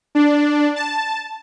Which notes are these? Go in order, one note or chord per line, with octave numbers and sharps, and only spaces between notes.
D4
A5